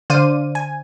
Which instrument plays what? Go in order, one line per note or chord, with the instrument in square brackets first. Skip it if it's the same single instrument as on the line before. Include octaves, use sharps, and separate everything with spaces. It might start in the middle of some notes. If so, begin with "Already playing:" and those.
[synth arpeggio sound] D3 C5 D5 F5 D#7
G#5